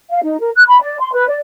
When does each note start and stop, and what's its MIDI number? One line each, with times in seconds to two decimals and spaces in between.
0.10 0.20 77
0.23 0.38 63
0.40 0.50 70
0.56 0.63 90
0.68 0.79 83
0.81 0.97 74
1.00 1.12 84
1.13 1.27 71
1.28 1.38 74